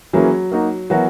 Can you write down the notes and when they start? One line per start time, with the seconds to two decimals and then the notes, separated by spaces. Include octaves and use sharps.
0.13 E3 F#3 A#3 C#4 G#4
0.52 A#3 D#4 F#4
0.90 E3 F#3 B3 F#4 A#4